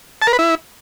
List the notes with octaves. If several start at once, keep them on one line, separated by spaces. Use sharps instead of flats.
A5
A#4
B4
E4